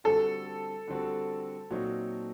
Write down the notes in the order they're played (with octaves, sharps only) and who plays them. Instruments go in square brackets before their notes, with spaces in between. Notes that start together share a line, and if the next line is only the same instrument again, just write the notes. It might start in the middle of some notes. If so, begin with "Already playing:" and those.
[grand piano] D3 G3 C4 F#4 [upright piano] A4
[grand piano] D3 G3 C4 F#4
A#2 F#3 C4 D#4 F#4